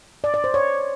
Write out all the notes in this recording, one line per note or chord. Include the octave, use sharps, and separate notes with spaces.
D5
D5
C5
C#5